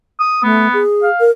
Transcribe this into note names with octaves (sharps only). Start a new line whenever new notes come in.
D#6
A3 B3
G#4
F5
A#4